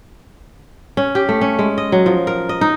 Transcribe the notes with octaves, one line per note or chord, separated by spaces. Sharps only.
C#4
G4
A3
C#4
G#3
D#5
F#3
F3
A#4
D#5
D#4